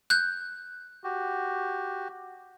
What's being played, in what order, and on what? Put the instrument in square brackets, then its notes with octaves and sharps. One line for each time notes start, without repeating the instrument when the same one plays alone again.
[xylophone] F#6 G6
[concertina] F#4 G4